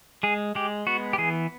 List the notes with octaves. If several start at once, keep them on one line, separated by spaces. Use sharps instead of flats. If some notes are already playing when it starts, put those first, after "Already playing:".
G#3 G#4
G#3 G4
B3 F#4
G4
E3 G#4